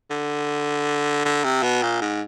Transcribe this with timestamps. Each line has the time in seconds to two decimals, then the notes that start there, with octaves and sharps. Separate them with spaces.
0.11 D3
1.25 D3
1.45 C3
1.63 B2
1.83 A#2
2.02 G#2